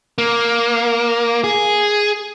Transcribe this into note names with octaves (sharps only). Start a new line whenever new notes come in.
A#3
G#4